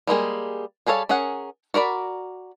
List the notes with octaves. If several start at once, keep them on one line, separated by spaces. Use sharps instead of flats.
G3 G#3 A#3 G#4
G3 G#4 A4 C#5 F5
C#4 G#4 A#4 F#5
F#4 A#4 D5 B5